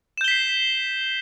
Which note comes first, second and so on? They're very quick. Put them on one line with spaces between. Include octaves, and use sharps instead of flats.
E7 G6 G7 B6 C7